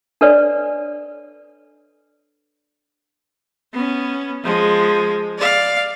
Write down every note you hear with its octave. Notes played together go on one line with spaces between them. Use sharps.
D4 A4 B4 C#5 D5
B3 C#4
F3 G#3
D5 F5